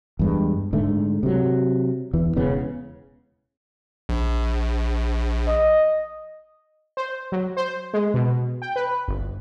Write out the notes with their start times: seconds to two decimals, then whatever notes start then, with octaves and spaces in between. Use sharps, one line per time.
0.19 E2 G2 G#3
0.73 G#2 D3 A3
1.23 C3 F#3
2.13 E2 E3
2.37 E1 E2 C#3 B3
4.09 A#1
5.48 D#5
6.97 C5
7.32 F#3
7.57 C5
7.94 G#3
8.14 B2
8.62 G5
8.76 B4
9.08 G1